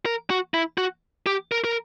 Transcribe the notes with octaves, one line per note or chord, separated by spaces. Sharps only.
A#4
F#4
E4
F#4
G4
A#4
A#4